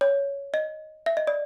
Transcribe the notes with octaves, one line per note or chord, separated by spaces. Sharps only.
C#5
D#5
E5
D#5
D5